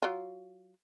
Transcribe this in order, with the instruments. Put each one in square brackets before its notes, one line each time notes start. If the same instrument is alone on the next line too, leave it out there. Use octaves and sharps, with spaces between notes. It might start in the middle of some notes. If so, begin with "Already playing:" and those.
[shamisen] F#3 F4